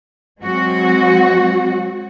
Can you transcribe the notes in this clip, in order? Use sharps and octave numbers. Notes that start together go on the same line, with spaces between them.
F#3 G#3 C4 F#4